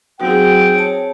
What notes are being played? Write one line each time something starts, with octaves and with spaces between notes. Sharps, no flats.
F#3 C4 D#4 F#4 G#4 G5
C#5 A5